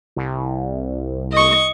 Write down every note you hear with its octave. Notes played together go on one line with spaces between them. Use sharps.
C2
D#5 C#6